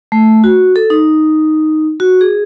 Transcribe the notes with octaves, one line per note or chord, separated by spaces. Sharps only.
A3
F#4
A4
D#4
F#4
G#4